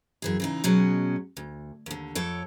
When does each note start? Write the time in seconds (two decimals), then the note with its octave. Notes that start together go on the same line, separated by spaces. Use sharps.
0.22 F#2 E3 G#4
0.40 C#3 E3 D#4
0.64 B2 F#3 G#3 C#4
1.37 D2
1.86 D#2 D3
2.15 F2 A4 C#5 G5